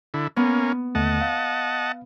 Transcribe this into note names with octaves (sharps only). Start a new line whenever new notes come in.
D3 E4
A#3 B3 C#4
D#2 D3 A3 D#5 F#5 A5
F5